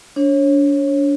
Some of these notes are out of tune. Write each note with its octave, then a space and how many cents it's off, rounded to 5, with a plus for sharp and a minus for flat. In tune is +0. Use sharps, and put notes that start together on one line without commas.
D4 -35 C#5 -25